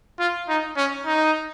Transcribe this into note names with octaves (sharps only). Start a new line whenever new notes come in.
F4
D#4
C#4
D#4